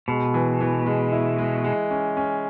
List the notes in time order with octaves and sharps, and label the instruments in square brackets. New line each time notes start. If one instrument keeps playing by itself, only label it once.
[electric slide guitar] B2 [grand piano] G#3
[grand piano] E3
E3
G#3
E4
G#3
G#3
C#4
C#4